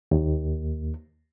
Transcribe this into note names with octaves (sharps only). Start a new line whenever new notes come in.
D#2